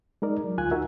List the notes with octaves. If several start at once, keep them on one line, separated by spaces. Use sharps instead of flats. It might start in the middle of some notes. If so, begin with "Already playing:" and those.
G#3 D#4 A#4 D5
F#3
D2 F4 G#5 F#6 G#6
D#4 F#4 A#4 E5